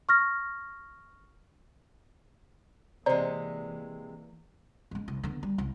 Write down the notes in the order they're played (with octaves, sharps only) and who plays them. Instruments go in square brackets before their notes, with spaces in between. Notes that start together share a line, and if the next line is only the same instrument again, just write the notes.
[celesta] C#6 F6 A#6
[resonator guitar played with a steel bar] C3 G#3 [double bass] E3 A#3 [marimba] C5 A#5 [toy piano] D5
[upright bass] G#3 C#4
C2
D3 B3
G3
C2